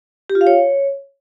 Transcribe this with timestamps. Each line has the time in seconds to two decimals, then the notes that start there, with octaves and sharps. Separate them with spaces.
0.30 G4
0.35 F4
0.41 F5
0.47 C#5